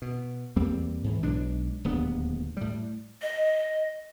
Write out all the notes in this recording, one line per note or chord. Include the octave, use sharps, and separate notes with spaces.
B2
E2 G3 A#3 C4
G#2 E3
B1 G#3 D4
D1 D#2 B3 D4
A2 G3
D#5